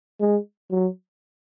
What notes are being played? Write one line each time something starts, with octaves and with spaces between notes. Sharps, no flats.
G#3
F#3